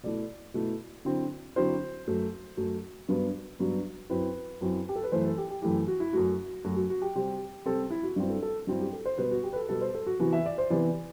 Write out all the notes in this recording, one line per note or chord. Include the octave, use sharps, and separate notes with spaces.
B2 A3 E4 D5
B2 A3 E4
D3 F#3 C4 E4
D3 F#3 C4 E4 C5
F#2 F#3 A3
F#2 F#3 A3
G2 F#3 B3 D4
G2 F#3 B3 D4
F#2 F#3 C4 E4 B4
F#2 F#3 C4 E4
G4
A4
B4
F#2 E3 A3 E4 C5
A4
G4
G4
F#2 E3 A3 E4 G4
F#4
E4
F#2 F#3 A3 F#4
F#2 F#3 A3 F#4
F#4
F#4
G4
C3 G3 C4
C3 G3 C4 A4
E4
F#4
G2 F#3 C4 E4
A4
A4
G2 F#3 C4 E4
G4
A4
C5
B2 G3 B3 B4
F#4
G4
B4
A4
B2 G3 B3 A4
C5
A4
F#4
C3 E3 B3 E4 F#4
E5
D5
C5
C3 E3 B3 E4 D5